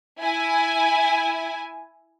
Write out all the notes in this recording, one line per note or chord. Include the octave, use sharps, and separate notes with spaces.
E4 G#5